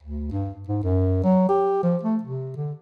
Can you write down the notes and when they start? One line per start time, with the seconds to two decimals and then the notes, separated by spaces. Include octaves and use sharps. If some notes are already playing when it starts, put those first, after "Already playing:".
0.03 D2
0.32 G2
0.68 G#2
0.83 F#2
1.24 F#3
1.49 G4
1.83 F3
2.03 A3
2.23 C3
2.56 D3